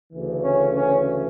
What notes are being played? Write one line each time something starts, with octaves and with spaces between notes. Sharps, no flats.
D2 C#3 E3
C#4
C#4